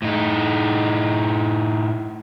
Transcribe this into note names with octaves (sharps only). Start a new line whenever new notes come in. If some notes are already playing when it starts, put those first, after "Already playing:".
A2 D#4